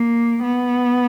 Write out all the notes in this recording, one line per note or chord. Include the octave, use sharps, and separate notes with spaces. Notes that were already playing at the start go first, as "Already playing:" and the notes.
Already playing: A#3
B3